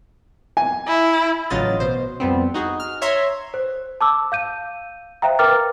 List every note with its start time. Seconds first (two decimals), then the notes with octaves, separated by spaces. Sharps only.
0.57 G#5
0.88 E4
1.50 A1 C#3 F#3 F4 D#5 A6
1.80 B2 C5
2.20 F2 G3 B3 C4
2.54 D#4 F#4 G#4
2.80 F6
3.02 C#5 E5 A#5 C6 G#6
3.54 C5
4.01 A5 D6 E6
4.32 F5 G6 D#7
5.22 C5 E5 F5 G5 A#5
5.39 A#4 B4 G5 D6 F6 A6